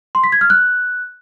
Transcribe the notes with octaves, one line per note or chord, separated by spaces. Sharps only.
C6
B6
G#6
F6
F#6